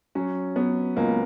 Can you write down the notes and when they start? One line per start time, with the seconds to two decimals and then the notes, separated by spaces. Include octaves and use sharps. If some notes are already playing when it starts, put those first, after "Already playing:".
0.15 F#3 C#4
0.56 F#3 B3
0.97 C#2 A#3